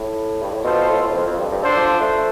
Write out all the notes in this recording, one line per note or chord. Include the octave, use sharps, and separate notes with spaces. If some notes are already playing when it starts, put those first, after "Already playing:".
Already playing: A2
G2
A2
B2 F4 A4 C5
A2
B2
A2
F2
F2
G2
G2
D3 D4 A4 C5
F3
F3
A3